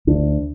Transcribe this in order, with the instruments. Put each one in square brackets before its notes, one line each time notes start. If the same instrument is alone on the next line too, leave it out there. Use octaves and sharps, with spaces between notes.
[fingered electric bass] D2 D4